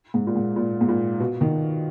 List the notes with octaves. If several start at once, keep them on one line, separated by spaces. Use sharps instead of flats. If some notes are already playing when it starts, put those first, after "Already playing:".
G#2
A#2
G#2
A#2
G#2
A#2
B2
D#3